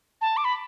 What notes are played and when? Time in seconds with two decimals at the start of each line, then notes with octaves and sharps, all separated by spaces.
0.21 A5
0.37 D6
0.44 B5